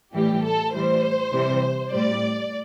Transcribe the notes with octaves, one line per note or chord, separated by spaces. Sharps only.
A2 E3 G3 G4
A4
A2 E3 G3 C5
C3 E3 G3
A2 G3 D5